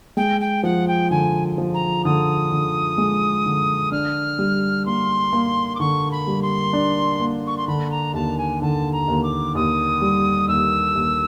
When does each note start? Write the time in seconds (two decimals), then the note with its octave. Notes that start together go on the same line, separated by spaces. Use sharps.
0.17 G#3 G5
0.41 G5
0.63 F3 F#5
0.88 G5
1.11 D3 G#5
1.58 F3
1.74 A#5
2.05 D3 D#6
2.52 D3
2.98 G#3
3.46 D3
3.92 D4 F6
4.39 G3
4.86 A#3 C6
5.33 A#3
5.75 D6
5.80 D3 C#6
6.11 B5
6.27 G3
6.42 C6
6.73 D4
7.20 A#3
7.47 C#6
7.57 C6
7.68 D3 B5
7.91 A#5
8.14 D#2 A5
8.38 G#5
8.62 D3 A5
8.93 A#5
9.08 D#2
9.23 D6
9.55 D#2 D#6
10.01 G3
10.48 D#2 E6
10.95 D#2